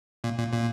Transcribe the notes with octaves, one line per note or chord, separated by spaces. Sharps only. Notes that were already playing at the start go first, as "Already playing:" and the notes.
A#2
A#2
A#2